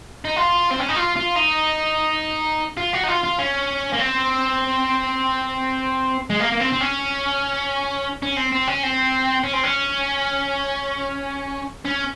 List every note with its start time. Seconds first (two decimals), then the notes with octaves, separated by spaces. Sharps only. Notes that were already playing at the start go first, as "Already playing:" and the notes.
0.25 D#4
0.36 F4
0.71 C4
0.79 C#4
0.88 D#4
0.96 F4
1.17 F4
1.36 D#4
2.77 F4
2.93 F#4
3.03 D#4
3.08 F4
3.23 F4
3.38 C#4
3.93 A#3
3.99 C4
6.30 G#3
6.40 A#3
6.52 A#3
6.61 C4
6.73 C4
6.81 C#4
8.23 C#4
8.37 C4
8.52 C4
8.68 C#4
8.83 C4
9.44 C#4
9.53 C4
9.64 C#4
11.85 C#4